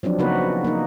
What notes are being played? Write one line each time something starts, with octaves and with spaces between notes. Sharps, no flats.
F3 F#3 C4 D4
C#3 A#3 B3 D#4 F#4 B4
A#3 D#4